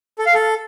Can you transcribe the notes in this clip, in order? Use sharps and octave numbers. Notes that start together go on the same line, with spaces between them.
A4
F5
A4